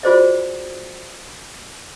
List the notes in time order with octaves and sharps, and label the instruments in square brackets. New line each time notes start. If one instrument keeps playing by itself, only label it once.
[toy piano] F4 F#4 G#4 C5 D5 D#5